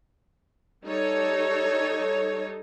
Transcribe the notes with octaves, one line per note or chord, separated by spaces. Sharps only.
G3 D#4 A4 C#5